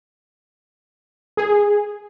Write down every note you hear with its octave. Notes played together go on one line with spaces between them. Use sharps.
G#4